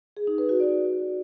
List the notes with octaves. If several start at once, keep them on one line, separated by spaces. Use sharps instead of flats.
G#4
D#4
B4
F#4
D5